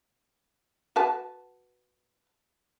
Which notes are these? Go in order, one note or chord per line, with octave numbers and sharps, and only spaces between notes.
F#4 B4 A5